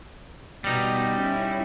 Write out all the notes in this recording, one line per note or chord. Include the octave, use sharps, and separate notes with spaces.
B2 G3 B3 D#4
C#4 E4